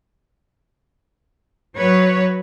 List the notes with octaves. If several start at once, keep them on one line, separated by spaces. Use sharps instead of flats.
F#3 B4 C#5